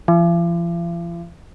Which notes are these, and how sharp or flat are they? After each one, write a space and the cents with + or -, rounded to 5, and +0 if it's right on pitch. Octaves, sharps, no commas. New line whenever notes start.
F3 -45